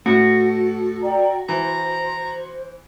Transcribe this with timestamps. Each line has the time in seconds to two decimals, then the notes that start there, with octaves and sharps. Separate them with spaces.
0.06 A2 F#4 A4
1.02 D5 G5 A#5
1.49 E3 C5 A#5